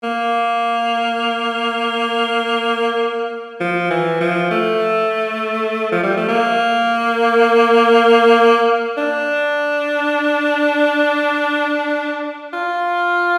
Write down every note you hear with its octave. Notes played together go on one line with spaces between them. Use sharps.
A#3
F3
E3
F3
A3
F3
G3
A3
A#3
D4
F4